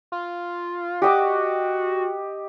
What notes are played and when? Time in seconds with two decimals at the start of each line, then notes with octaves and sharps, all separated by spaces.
0.12 F4
1.02 F#4 G4 D#5 D6